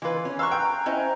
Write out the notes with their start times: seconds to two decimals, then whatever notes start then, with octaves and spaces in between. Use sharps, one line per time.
0.02 E3 G#3 F4 B4
0.25 C#4
0.39 F5 A#5 C6 C#6 E6 F#6
0.51 G5
0.86 C#4 E4 C5 D#5 A#5